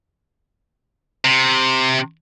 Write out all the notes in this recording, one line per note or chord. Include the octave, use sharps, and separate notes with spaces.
C3